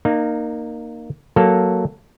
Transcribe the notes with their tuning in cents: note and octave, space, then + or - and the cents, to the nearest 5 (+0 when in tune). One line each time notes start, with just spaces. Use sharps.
A#3 +0 D#4 -25
F#3 +5 A#3 +0 A4 +0